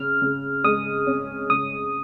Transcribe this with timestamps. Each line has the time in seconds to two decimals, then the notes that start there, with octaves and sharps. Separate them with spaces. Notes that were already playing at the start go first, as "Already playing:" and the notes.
Already playing: C#3 F6
0.22 C#3
0.64 G#3 D#6
1.07 C#4
1.50 C#3 D#6